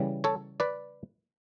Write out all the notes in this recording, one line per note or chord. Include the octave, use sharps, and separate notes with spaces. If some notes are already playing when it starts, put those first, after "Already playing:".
Already playing: C#3 E3 G3
A4 C#5
B4 D5